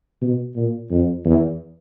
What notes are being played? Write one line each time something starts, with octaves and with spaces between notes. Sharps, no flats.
B2
A#2
F2
E2